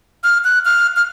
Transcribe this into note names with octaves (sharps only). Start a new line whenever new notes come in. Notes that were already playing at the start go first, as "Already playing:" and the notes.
F6
F#6
F6
F6